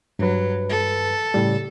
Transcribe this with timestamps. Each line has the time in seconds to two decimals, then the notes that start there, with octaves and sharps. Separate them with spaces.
0.19 G2 F#3 B4
0.69 A4
1.34 A2 C#3 G3